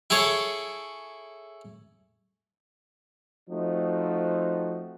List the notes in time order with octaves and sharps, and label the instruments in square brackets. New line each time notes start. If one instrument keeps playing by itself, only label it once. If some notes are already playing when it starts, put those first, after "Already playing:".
[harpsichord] E4 G#4 A4 C#5
[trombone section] F3 A3 C4 D#4 F#4